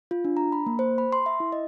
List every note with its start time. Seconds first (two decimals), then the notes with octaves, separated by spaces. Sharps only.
0.11 F4
0.25 D4
0.37 A#5
0.52 B5
0.66 A#3
0.79 C5
0.98 B5
1.13 C6
1.26 E5
1.40 E4
1.52 D#5